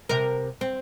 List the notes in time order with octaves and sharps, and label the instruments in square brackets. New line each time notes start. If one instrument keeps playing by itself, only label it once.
[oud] C3 A#4
C4